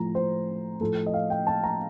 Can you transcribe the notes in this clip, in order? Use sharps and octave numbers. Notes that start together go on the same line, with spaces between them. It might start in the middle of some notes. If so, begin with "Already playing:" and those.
Already playing: A2 F3 A#5
C5
A2 F3 A4
D#5
F5
G5
A5
A#5